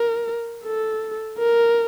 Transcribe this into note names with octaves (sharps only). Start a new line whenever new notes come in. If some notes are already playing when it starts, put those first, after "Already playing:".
Already playing: A#4
A4
A#4